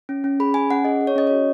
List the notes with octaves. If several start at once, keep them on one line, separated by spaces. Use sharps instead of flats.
C#4
C#4
G#4 B5
C#4 G#5
C#4 F#5
G#4 D#5
G#4
C#5
C#4 D#5
F#4 C#5